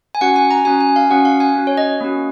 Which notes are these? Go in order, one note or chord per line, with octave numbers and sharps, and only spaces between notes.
G#5
C#4 F#4 F#5
G#5
A#5
C#4 F#4 G#5
G#5
F5
C#4 F#4 F#5
F5
G#5
C#4 F#4
C#5
D#5
A#3 C#4 F#4